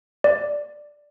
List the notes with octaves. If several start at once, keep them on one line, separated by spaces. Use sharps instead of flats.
D5